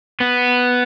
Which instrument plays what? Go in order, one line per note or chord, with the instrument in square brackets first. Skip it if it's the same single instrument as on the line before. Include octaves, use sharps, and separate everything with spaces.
[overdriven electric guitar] B3